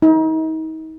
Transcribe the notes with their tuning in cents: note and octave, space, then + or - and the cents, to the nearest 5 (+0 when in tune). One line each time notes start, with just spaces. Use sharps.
D#4 +35